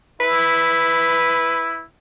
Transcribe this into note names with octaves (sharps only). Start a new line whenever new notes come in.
E4 B4